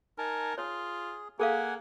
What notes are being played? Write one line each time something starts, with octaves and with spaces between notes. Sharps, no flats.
D#4 A#4 G#5 A5
F4 G#4 C#5
A#3 G#4 A4 F5 F#5 G#5